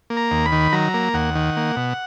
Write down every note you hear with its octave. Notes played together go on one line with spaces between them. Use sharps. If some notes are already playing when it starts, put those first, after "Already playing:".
A#3
A#5
D#2
B5
D#3
F#3 A#5
A#3
D#2 F#5
D#3
A#3
B2